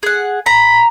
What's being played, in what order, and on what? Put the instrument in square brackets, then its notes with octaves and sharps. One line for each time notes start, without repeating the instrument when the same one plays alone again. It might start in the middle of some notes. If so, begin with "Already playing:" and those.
[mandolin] G#4 F#5
[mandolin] A#5 [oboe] B5